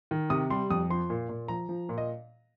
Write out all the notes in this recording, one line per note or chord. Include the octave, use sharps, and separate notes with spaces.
D#3
C3 D#6
G3 C6
F2 D#6
F3 C6
A#2
A#2
F3 A#5
F3
A#2
D#5